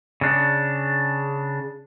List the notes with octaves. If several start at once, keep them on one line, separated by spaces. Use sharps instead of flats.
C#3 D4